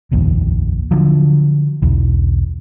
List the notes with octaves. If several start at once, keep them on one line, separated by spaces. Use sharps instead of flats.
F1 A#1 D#2
D3 F3 F#3
B1 E2